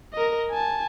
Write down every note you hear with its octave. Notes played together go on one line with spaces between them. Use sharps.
A#4 D#5
G#5 A5